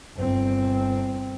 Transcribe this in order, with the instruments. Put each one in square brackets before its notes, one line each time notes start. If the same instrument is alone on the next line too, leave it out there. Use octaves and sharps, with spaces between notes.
[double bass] G1 C4